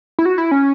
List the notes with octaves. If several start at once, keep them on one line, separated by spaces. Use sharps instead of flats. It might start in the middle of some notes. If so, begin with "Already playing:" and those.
E4
F#4
E4
C#4